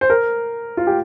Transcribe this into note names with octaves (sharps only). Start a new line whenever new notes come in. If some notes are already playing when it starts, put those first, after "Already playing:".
C5
A#4
F4
G4